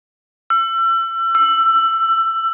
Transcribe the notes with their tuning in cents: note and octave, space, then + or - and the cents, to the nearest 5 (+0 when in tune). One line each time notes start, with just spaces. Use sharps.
E6 +35
E6 +20